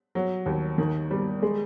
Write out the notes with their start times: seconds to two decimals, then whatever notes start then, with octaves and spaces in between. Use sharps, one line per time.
0.15 F#3
0.46 D#2
0.78 D#3
1.11 G3
1.42 G#3